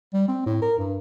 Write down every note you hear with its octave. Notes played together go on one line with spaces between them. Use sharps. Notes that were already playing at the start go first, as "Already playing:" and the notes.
G3
C4
A2
A#4
G2